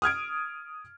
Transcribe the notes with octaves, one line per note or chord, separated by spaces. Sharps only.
D#6 F6 G#6 D7